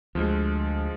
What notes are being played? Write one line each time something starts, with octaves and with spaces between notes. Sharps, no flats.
D2 F3 G#3